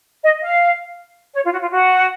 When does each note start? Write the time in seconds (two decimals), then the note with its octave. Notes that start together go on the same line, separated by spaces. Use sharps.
0.23 D#5
0.42 F5
1.34 C#5
1.44 F4
1.52 F#4
1.62 F4
1.71 F#4